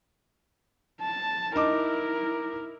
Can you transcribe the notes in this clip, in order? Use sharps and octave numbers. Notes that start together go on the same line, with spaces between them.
A5
D#4 E4 A#4 D6